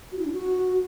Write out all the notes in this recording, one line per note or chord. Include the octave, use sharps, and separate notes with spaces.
F#4
E4
D4
F#4